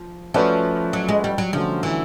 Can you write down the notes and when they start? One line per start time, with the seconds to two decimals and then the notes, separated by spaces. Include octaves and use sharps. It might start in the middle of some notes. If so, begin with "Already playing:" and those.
Already playing: F3
0.34 F3 A3 C#4 F#4 B4 D5
0.93 F#3
1.09 G#3
1.24 G3
1.38 F#3
1.53 D3 F3 F#3 A3 C#4
1.83 E3